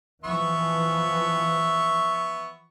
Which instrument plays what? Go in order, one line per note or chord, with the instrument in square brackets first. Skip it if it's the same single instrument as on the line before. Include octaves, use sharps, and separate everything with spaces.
[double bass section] E3 F3 [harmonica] B3 E5 C#6